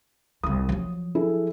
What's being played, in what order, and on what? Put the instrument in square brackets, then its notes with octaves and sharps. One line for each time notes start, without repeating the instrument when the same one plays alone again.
[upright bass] C2 F4 [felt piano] D#6
[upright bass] F3 F#3
[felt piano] E4 G#4 A4